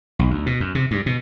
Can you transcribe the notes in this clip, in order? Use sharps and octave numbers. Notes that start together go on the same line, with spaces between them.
B1
D2
B2
F#2
C3
G2
B2